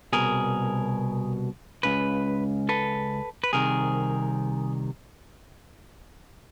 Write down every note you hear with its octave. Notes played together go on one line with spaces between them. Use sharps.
C2 B2 G#4 A#4
C#2 C#3 B4
A4 B4
B4
C2 C3 D#3 G#4 A#4